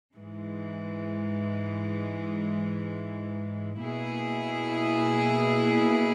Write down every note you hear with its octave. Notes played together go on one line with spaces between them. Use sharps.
G#2 E3 G#3
B2 A#3 E4 G#4